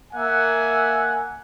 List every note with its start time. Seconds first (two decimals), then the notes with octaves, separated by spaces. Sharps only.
0.13 A#3 E5 F#5 G#5